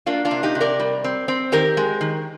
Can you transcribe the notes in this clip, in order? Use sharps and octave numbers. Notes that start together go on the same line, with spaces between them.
A#3 D4 F4
D4 F4
C3
D#4 G4
C3
A#4 D5
G3
C4
C4
D#3 G4 A#4
G#3
D#3